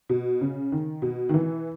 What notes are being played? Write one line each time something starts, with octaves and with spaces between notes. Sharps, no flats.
B2
C#3
D#3
B2
D#3
E3